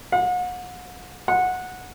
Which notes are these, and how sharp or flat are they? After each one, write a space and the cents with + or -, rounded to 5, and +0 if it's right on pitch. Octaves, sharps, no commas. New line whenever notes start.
F#5 -40
F#5 -15